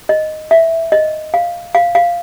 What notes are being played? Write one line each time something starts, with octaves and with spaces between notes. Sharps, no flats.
D#5
E5
D#5
F5
F5
F5